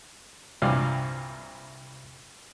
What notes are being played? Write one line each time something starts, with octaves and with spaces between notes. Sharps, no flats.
C2 G2 A#2 E3 D5 F5